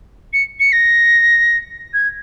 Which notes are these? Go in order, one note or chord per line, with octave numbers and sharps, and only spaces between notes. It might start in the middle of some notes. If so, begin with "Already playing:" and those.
C#7
C#7
A#6
G#6